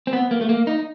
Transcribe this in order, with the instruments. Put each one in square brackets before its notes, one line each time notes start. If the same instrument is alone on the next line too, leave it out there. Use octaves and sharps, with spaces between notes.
[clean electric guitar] C4
B3
A#3
A3
A#3
D#4